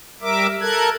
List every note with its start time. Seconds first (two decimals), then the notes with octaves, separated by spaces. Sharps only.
0.21 G3 A#4 E5 D6
0.61 A4 A#4 F#6 G#6